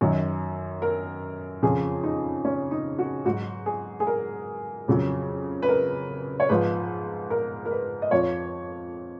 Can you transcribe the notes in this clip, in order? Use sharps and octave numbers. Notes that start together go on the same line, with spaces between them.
F#2 D#3 F#3
A#4
F2 C#3 F3 G#4
D#4
C#4
D#4
F#4
G#2 F#3 F#4
G#4
G#4
A#4
F2 C#3 F#3
B4
A#4
C#5
G#2 F3 B4
A#4
A#4
B4
D#5
F2 F3 C#5